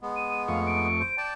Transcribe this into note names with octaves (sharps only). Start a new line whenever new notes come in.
G#3 B3
D#7
F2 A3 F5 C#6
D7
C5
D5 G5 A5